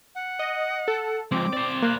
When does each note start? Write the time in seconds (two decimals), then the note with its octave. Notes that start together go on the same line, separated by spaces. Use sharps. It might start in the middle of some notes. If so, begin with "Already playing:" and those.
0.15 F#5
0.39 D#5
0.88 A4
1.32 F3 G#3 C4 D6
1.53 C5 D5
1.82 A#3 F#6